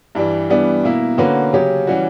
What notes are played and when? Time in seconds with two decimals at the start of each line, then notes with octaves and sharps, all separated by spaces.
0.15 G2 E3 G3
0.50 E3 G3 B3 D4
0.84 B2 A#3 E4
1.18 D3 A#3 C#4 F#4 B4
1.53 C#3 F#3 C#4 G4
1.87 E3 G3 C#4 F#4